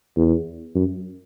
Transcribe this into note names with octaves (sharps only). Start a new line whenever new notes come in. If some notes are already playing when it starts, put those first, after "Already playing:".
E2
F#2